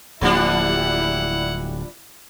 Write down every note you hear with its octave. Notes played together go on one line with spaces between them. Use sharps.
D1 F3 G3 A#3 D4 E4 F#5